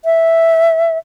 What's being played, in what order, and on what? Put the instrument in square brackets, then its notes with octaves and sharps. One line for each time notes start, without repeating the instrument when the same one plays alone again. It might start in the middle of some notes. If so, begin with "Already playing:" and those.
[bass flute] E5